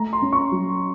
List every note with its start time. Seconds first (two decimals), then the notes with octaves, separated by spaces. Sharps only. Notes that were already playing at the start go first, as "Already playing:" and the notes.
Already playing: A3 A#5
0.13 C6
0.22 C#4
0.33 C#6
0.51 F#3